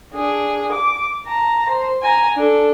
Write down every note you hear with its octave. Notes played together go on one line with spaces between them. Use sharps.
D4 G#4
D6
A5 A#5
C5
G#5 A#5
D4 A4